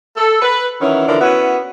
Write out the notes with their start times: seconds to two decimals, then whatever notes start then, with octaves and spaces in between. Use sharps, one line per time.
0.17 A4
0.42 B4
0.81 D#3 E3 F#3 C#4
1.08 D3 E3 F3 D4 A#4
1.21 B3 C#4 E4 F#4 B4